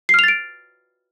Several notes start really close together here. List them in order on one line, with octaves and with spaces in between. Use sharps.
C7 F6 F7 A6 D7